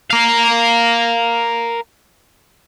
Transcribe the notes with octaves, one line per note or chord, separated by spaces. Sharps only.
A#4 F5